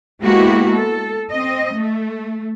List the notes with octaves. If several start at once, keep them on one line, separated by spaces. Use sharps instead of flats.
G#3 A#3 B3 E4 F#4 G4
A4
C4 D#5
A3